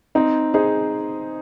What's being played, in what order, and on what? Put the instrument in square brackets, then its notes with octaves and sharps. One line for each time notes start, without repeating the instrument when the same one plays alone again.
[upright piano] C4 [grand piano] D#4
[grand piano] D#4 [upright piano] G#4 C5